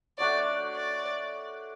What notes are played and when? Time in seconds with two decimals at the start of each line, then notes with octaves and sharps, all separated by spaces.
0.18 A3 D4 F#4 C#5 D5
0.75 D5